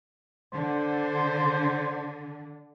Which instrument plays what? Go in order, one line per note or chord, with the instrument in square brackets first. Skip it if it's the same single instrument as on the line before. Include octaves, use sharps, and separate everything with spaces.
[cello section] D3 [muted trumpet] C5